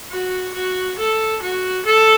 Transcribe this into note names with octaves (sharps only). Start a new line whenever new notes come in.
F#4
F#4
A4
F#4
A4